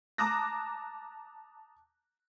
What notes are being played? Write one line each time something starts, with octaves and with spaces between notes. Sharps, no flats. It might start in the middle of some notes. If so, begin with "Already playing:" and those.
A5 A#5 D6 D#6 F#6 A#6